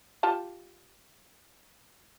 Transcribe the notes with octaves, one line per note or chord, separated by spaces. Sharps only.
F4 G4 A5